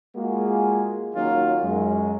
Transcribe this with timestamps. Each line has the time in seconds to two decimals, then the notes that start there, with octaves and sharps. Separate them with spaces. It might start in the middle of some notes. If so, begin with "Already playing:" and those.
0.16 G#3 A#3 F4 F#4 G#4
1.14 D#3 F#3 A#3 C#4 D#4 F4
1.62 F#2 F#3 G#3